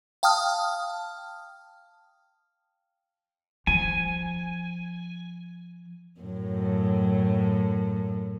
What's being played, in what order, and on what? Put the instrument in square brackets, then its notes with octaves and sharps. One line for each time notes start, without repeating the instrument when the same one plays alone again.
[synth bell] F5 G5 A5 D#6 F6
[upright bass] F3 [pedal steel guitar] G#5
[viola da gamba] F#2 A2